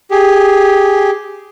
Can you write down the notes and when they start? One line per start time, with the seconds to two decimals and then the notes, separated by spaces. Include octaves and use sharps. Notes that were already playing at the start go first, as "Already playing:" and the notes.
0.11 G4 G#4